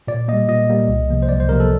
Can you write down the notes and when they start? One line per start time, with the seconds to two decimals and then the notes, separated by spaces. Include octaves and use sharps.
0.08 A#2 D5
0.28 G3 A#3 D#5
0.49 A#2 D#5
0.69 G3 A#3
0.88 C2
1.09 C3 F3 A#3
1.22 C5
1.29 C2 D5
1.40 C5
1.49 C3 F3 A#3 A#4
1.60 A4